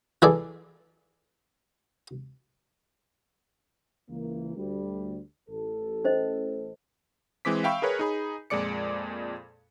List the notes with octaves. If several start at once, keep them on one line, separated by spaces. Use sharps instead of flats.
E3 G#4 A4 D5
C#2 E3 A#3
D2 G3
A1 A4
C#4 C5 D#5
E3 G#3 C4 D6 B6
E5 F5 G5 B5 C#6 E6
G#4 A#4 B4 C#5
D#4 G#4 B5
F2 A#2 G#3 D5 D6 C#7